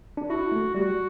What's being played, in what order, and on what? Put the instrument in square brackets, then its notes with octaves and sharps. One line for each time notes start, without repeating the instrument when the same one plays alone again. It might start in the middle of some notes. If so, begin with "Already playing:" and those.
[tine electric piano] D4
[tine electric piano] E4 [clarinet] F#4
[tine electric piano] A3
[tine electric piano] G3 [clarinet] F#4